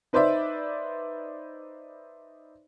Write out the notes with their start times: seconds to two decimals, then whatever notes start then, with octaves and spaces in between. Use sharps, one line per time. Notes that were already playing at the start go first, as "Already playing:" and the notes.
0.13 D#4 B4 C5 D5 E5